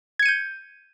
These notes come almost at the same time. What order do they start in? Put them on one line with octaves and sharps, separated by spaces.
G#6 C#7 D#7 G6